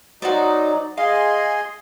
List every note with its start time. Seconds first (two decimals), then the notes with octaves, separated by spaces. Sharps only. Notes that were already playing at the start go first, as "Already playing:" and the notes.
0.22 F#3 D#4 F#4 C5 D5
0.97 G#4 D#5 F5 C6